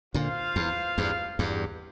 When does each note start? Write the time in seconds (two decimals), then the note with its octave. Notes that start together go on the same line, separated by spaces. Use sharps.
0.14 A#2 D3 F4 C5 F5
0.56 E2
0.98 E2 G2
1.39 E2 G2